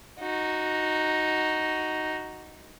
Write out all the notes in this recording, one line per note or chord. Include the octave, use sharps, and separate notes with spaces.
D#4 F#4